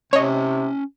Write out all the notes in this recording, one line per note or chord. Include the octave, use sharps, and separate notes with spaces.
C3 C#4 C#5 D#5 A5